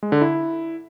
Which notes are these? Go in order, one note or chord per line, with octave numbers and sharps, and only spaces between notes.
G#3
D3
E4